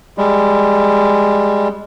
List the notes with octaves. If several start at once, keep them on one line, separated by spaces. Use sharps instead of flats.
G3 G#3